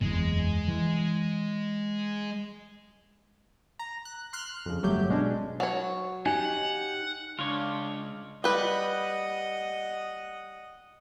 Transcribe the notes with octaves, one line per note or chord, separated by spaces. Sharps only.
F#1 E2 G#3
E3
A#5
F#6
C6 F6 F#6 C7
F2 C#3
G1 F#3 A3 G4 G6
B2 G#3 C#4 D4
F#3 C#5
D#4 G4 F#5 G#5
C#2 D4 F4 C#5 D6
G3 B4 D#5 F#5